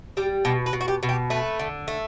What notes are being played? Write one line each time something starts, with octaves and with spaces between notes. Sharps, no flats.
G3 G4
B2 G4
B4
B2
F#4
G4
B2
G4
A3 B4
D3
A3